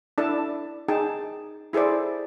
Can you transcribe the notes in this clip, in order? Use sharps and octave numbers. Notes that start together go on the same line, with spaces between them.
D4 E4 A4 D5 A5
D#4 G#4 G5 A5
E4 G#4 A4 C5 D5